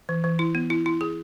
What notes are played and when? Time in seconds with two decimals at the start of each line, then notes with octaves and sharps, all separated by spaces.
0.09 E3
0.24 E3
0.39 E4
0.55 B3
0.70 E4
0.86 E4
1.01 G#4